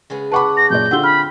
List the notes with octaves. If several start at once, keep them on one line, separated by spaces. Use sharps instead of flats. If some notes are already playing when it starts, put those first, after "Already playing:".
C#3 G#3 B3
B4 F#5 A5 B5 C#6 D6
A#6
F#2 A#2 D5 G6
D3 C4 F4 F#5 E6 G7
B5 F6